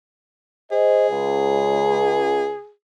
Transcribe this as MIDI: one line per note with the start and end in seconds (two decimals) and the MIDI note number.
0.72 2.71 68
0.72 1.06 72
0.72 1.06 75
1.09 2.54 37